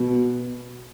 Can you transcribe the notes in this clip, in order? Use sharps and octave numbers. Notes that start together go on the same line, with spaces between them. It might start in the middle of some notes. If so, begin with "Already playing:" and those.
Already playing: B2